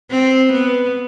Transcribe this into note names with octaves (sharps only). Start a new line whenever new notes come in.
C4
B3